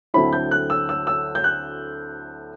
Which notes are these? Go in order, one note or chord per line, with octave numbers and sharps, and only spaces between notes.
D2 D3 F#3 C4 E4 B5
G6
F#6
E6
E6
E6
G6
F#6